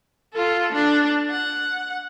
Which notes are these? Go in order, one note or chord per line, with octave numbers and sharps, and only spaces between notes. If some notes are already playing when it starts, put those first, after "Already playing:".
F4 A4
D4
F#5